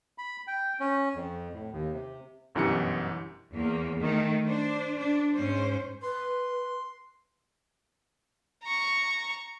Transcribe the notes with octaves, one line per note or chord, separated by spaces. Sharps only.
B5
G5
C#4
F2
A2
D#2
C3
G1 F#2 B2 E3 G4 C#7
E2 A#3
D#3 A3
D4 C5
D4
G#2 C#4 C5
B4 C6
A#5 C#6